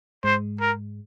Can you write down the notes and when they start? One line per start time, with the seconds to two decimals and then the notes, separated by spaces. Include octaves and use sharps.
0.24 G#2 G#3 C5
0.60 A#4